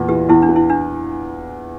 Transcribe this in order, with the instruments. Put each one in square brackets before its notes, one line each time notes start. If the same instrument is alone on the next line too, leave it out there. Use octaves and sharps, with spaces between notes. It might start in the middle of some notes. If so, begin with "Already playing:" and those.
Already playing: [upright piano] E2 A#2
[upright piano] E3 [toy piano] G4
[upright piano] E2 [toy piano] E4
[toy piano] D4
[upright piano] E3
[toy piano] E4
D4